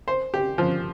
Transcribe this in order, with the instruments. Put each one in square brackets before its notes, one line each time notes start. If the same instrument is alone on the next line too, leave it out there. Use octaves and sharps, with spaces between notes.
[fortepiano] C5
G4
F3